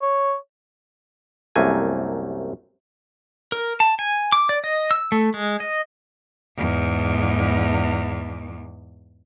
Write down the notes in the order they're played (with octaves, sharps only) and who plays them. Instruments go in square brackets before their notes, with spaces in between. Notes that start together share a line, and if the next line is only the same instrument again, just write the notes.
[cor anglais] C#5
[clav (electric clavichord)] C2 F#2 A3 A#3 G#5
[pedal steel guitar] A#4
A5
G#5
D6
D5
D#5
E6
A3
G#3
D#5
[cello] E2 G#2